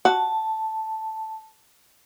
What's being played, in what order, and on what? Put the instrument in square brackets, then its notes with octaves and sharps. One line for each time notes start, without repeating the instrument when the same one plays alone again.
[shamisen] F#4 [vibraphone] A5